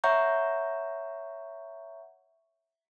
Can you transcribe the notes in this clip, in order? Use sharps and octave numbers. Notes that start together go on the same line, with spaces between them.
C#5 E5 F#5 A#5 C#6 G6